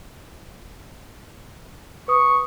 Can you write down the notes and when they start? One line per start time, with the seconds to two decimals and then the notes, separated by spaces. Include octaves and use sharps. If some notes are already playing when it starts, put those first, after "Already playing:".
2.08 B4 C#6 D#6